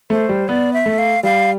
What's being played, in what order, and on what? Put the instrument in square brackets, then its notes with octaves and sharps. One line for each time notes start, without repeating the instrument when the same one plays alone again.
[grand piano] A3 [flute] C5
[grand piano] G3
[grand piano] B3 [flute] D5
[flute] E5
[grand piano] A3
[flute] F5
[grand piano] G3 [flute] F5